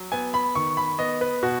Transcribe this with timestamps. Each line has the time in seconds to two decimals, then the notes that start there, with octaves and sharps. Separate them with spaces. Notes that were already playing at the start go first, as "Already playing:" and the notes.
Already playing: F#3
0.12 B3 G#5
0.34 B5
0.55 D#3 C#6
0.77 B5
0.99 B3 D#5
1.21 B4
1.43 B2 F#4